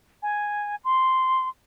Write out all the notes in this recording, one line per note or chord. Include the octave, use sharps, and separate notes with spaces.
G#5
C6